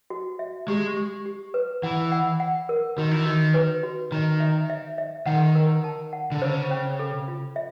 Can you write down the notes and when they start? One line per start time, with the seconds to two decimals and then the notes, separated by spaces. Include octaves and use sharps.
0.10 F#4
0.39 E5
0.68 G#3 G4
0.97 G4
1.26 G4
1.54 B4
1.83 E3 F#5
2.12 F#5
2.40 F#5
2.69 A#4
2.98 D#3 F#4
3.11 E3
3.25 D#3 F#4
3.54 B4
3.83 F#4
4.12 D#3 A#5
4.40 E5
4.70 E5
4.98 E5
5.26 D#3 F#5
5.55 A#4
5.84 A5
6.13 F#5
6.32 D3
6.42 C#3 C5
6.71 C#4
6.99 A4
7.28 F4
7.56 E5